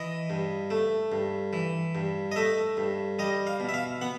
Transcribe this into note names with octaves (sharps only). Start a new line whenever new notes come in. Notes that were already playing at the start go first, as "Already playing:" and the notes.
Already playing: E3 D#5
G2
A3
G2
E3
G2
D#5
A3 E5
G2
G3 D#5
F5
B2
E5
F5
B3 F#5